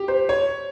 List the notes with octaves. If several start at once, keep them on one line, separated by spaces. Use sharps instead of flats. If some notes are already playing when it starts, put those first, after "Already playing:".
Already playing: G4
C5
C#5